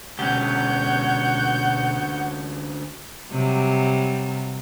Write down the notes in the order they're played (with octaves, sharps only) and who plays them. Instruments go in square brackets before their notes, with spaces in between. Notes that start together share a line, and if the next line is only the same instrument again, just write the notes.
[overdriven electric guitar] D2 C#4 [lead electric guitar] B2 G4 [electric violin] C#5 G6 [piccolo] F#5
[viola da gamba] C3 F#3 G3